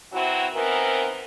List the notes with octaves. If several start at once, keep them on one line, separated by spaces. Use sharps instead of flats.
E3 F#3 C4 E4 F#4
D#3 E3 B3 C4 A#4